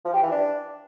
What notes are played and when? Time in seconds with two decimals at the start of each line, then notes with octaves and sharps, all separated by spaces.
0.05 F3
0.14 G4
0.23 E3
0.31 D4